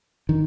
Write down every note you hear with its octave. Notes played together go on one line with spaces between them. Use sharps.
D#3